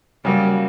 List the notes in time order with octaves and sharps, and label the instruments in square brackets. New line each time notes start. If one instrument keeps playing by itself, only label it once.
[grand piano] C#3 F#3 A#3 [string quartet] G3